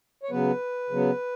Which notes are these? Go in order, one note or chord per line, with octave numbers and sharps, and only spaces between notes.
C#5
C#3 F#3 B3 B4
C#3 F#3 B3